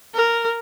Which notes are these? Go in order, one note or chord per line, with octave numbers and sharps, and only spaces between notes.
A#4